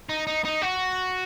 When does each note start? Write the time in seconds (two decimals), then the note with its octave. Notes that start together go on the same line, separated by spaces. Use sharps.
0.09 D#4
0.27 D#4
0.45 D#4
0.62 F#4